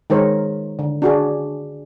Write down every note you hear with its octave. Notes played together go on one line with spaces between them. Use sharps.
D#3 G#3 D#4 A#4 C5 C#5
D3
D4 F#4 G#4